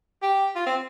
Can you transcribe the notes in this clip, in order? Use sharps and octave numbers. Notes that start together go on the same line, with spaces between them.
G4
F4
C4